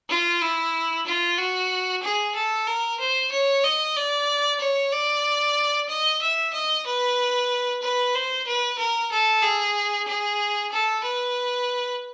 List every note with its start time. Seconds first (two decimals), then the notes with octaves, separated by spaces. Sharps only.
0.10 F4
0.42 E4
1.06 F4
1.38 F#4
2.03 G#4
2.35 A4
2.67 A#4
3.00 C5
3.32 C#5
3.64 D#5
3.96 D5
4.61 C#5
4.92 D5
5.89 D#5
6.21 E5
6.53 D#5
6.86 B4
7.82 B4
8.15 C5
8.47 B4
8.79 A#4
9.12 A4
9.43 G#4
10.08 G#4
10.72 A4
11.04 B4